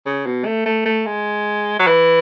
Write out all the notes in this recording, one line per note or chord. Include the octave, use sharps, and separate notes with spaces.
C#3
B2
A3
A3
A3
G#3
F#3
E3